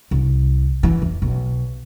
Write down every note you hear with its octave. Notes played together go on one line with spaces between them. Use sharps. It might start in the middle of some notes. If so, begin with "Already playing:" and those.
C2
E3
F2
B1